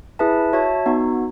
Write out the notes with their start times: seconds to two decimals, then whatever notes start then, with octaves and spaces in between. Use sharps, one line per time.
0.19 E4 G#4 B4 E5 A5
0.53 F#4 C#5 E5 A5
0.86 B3 D#4 F#4